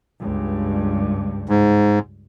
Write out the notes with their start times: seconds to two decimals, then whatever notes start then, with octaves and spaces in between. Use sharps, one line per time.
0.20 C#2 G2
1.49 G#2